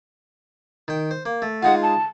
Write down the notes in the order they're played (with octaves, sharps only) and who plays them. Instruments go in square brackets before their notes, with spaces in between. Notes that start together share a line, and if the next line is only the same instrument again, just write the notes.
[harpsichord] D#3 G5
C5
A#3
A3
[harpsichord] G#3 D#4 F4 [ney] F#5
[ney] A5